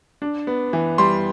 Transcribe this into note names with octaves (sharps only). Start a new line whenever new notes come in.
D4
B3
E3
G3 C6